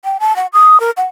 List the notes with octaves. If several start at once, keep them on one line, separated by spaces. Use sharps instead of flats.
G5
A5
F#5
D#6
A#4
F#5